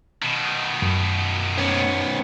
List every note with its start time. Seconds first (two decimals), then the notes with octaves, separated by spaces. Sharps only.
0.22 B2 D#3
0.82 F#2
1.58 B3 C#4